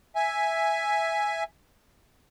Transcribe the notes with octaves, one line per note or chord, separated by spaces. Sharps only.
E5 G#5